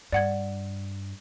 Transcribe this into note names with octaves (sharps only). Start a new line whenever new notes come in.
G2 D5 F#5 G#6